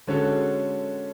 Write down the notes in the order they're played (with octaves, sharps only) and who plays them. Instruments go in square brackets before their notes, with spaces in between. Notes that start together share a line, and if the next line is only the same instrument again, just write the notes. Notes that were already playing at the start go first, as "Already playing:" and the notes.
[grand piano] D3 G#3 C#4 F#4 A4